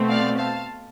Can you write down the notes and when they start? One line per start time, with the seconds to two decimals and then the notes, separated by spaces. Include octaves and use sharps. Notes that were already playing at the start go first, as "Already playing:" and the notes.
Already playing: B2 A3 C4
0.08 D5 F5
0.38 F5 A5